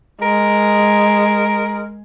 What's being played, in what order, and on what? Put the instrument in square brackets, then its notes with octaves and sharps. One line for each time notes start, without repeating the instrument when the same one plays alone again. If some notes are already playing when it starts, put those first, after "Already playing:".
[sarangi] G#3 [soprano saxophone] A#4